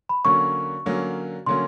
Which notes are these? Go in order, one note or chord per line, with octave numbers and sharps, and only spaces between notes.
B5
D3 F#3 A#3 C#4 C#6
D3 F#3 A#3 C#4
D3 F#3 A#3 C#4 C6